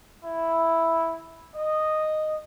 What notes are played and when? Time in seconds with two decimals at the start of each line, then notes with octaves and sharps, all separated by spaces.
0.24 E4
1.55 D#5